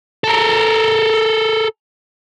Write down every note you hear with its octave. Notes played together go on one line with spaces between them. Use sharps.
A4 A#4